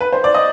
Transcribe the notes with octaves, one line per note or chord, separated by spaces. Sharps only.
B4
C5
D5
D#5